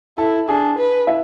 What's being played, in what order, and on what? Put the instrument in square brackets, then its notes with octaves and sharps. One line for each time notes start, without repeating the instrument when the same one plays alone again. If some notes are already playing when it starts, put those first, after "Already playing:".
[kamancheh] E4 [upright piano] A4 A5
[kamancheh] D4 [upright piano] G#4 G#5
[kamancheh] B4
[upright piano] E4 E5